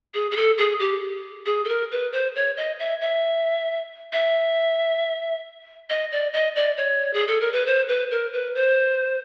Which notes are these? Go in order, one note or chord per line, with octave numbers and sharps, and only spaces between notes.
G#4
G#4
A4
G#4
G4
G#4
A4
A#4
B4
C5
C#5
D#5
E5
E5
E5
D#5
D5
D#5
D5
C#5
G#4
A4
A#4
B4
C5
B4
A#4
B4
C5